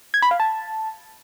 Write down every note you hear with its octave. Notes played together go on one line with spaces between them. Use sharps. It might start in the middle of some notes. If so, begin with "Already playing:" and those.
G#6
B5
F5
A5